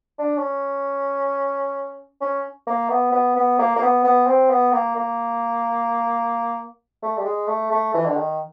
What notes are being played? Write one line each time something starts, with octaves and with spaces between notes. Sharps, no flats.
D4
C#4
C#4
A#3
B3
B3
B3
A#3
A#3
B3
B3
C4
B3
A#3
A#3
A3
G3
G#3
A3
A3
E3
D3
D#3